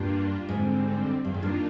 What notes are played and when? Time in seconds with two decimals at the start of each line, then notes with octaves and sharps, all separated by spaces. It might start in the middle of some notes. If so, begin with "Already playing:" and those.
Already playing: G2 G3 A#3 D4 F4
0.48 G#2 D3 G3 C4
1.24 G2 D#3 A#3 D4 F4
1.34 G#2
1.43 G2